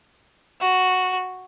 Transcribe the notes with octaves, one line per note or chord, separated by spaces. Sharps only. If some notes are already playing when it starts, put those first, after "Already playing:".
F#4